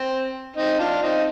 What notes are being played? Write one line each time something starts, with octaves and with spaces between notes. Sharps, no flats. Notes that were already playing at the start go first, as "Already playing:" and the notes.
Already playing: C4
C4 D#4
D4 F4
C4 D#4